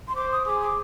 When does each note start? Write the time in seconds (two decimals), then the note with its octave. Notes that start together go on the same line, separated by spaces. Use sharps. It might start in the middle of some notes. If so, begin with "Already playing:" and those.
0.08 C6
0.16 C5 D6
0.32 D#6
0.46 G#4 D6
0.62 D6